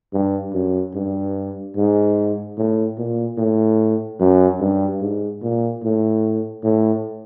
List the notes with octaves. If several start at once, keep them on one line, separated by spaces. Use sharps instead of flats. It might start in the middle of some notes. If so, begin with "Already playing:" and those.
G2
F#2
G2
G#2
A2
A#2
A2
F#2
G2
G#2
A#2
A2
A2